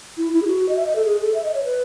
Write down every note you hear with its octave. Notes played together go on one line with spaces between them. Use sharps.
E4
E4
G#4
F#4
D#5
E5
D#5
A4
G#4
A4
E5
D#5
C#5
B4